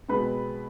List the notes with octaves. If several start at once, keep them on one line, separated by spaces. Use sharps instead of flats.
B2 G#3 C4 B4 B5